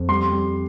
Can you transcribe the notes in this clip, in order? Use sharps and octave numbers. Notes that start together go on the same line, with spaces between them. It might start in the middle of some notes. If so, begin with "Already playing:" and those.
Already playing: F2
G3 C6
G3